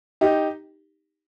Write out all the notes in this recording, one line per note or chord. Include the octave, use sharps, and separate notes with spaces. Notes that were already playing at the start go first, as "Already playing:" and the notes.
D#4 G4